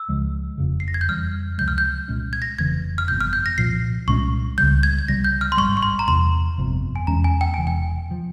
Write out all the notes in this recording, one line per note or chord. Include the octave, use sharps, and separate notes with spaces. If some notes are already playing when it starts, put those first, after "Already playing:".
Already playing: E6
C#2 C#3 F3 G#3
F1 F2 C#3
C7
A#6
G#6
G6
F2 E3 G3 F6
C#2 C3 F3 G#3 G6
F6
G6
C2 A#2 G#3 C#4
G#6
A#6
F1 F2 C#3 E3 G#6
F6
G1 F2 C3 G6
F6
G6
A#6
C2 A#2 F3 A#3 C7
C2 A#2 G#3 C#4 C#6
C#2 C#3 G3 G6
G#6
G#6
C2 C3 G3 A#6
G6
F6
C6
G#1 G2 G3 C#6
C#6
C6
A#5
E2 C3 G3 C6
G1 F2 C3
G#5
E2 E3 G#3 C#4 A#5
G#5
G5
E1 E2 C3 E3 G#5
G5
C3 F3